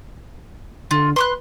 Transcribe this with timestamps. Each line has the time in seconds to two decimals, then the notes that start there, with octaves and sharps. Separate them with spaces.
0.91 D3 F4
1.16 B4 C6 C#6 F#6